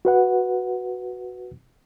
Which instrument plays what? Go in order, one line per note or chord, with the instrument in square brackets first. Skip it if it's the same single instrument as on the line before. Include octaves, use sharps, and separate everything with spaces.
[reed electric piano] F#4 B4 F#5